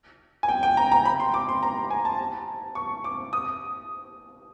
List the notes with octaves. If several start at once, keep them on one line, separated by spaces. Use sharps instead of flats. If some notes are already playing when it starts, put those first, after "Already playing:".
G#5
G5
G5
A#5
A#5
B5
C6
D6
C6
A#5
G#5
A5
C#6
D6
D#6